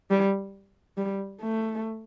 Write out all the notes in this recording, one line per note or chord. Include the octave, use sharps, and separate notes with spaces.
G3
G3
A3